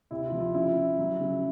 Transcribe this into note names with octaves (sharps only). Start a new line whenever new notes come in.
C3 E4
F4
F3
F4
C#3 E4
C#3
F#3
C#3